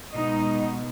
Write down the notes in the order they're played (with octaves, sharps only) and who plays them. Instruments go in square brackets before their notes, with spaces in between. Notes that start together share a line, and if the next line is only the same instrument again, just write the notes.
[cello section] B2 G#3 B3 D#4 D#5